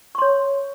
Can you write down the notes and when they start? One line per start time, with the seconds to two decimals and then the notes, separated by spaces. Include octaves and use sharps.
0.15 C#6
0.18 C6
0.22 C#5